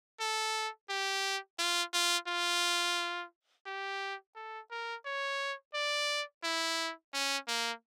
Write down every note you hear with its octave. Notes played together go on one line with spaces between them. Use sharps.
A4
G4
F4
F4
F4
G4
A4
A#4
C#5
D5
E4
C#4
A#3